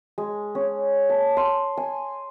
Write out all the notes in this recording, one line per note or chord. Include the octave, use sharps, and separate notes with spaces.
G#3
C#4
A5
C6
G#5